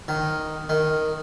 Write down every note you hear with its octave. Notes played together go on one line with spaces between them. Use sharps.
D#3
D#3